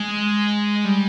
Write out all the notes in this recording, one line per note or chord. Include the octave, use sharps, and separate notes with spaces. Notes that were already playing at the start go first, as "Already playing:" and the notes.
Already playing: G#3
G3